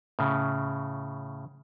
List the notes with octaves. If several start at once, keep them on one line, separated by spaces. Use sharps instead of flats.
A2 C#3